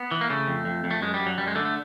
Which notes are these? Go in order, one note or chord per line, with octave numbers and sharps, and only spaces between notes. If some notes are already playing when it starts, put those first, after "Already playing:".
Already playing: B3
E3
A#3
C#3 A3
F2
F2
F2
A3
F#2 G#3
G3
F#2
F#3
F#2 G3
G#3
D3 A3
A3